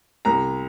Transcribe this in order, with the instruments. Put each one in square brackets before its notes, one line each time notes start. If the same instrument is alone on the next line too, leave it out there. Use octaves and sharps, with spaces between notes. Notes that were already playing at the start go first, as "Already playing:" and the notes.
[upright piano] C2 A#5